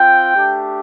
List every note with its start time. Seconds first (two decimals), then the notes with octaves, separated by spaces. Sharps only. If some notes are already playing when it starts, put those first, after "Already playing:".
Already playing: C4 F4 G5
0.33 A3 D4 G4